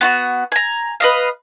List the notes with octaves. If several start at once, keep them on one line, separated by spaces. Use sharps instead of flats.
B3 F4 F#4
G#5 A#5
B4 D#5 F5